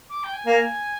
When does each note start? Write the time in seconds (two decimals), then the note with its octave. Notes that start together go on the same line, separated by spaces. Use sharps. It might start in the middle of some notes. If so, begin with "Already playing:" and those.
0.10 D6
0.24 G5
0.33 G#5
0.46 A#3